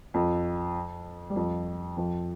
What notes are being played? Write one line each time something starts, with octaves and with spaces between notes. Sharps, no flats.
F2 F3
G3
F2 F3
F2 F3